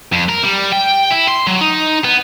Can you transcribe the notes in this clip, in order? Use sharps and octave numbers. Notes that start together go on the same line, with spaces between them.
F2
A#4
G3
G5
E4
C6
F#3
D#4
B3